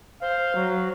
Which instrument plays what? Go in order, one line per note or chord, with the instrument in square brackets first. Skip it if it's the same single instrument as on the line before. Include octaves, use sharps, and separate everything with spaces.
[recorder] C5 [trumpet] F5
[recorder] F#3